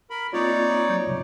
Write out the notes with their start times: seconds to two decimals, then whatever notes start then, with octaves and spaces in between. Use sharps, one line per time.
0.10 A#4 B5
0.33 A#3 C4 D#4 F4 C#5 D5
0.89 F#3 G6
1.05 D2 G2 C3